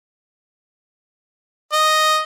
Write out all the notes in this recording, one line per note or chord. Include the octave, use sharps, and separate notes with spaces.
D#5